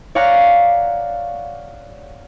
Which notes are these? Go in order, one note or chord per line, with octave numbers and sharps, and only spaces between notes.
C#5 D5 F5 F#5 A#5